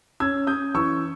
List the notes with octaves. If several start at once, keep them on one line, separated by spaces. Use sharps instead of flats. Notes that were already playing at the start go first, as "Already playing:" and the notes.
C#4 E6 G#6
C#4 D#6 G6
E3 C#6 E6